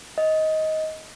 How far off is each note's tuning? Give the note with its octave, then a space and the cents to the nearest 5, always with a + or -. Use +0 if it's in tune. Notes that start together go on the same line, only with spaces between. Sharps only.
D#5 +15